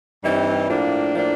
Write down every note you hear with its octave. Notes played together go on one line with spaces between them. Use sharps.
G2 E3 G3 C4 D#4
A2 F3 A#3 D4
A2 F3 A#3 D4